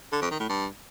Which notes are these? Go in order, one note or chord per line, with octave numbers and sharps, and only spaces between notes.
D3
F2
D#3
A2
G2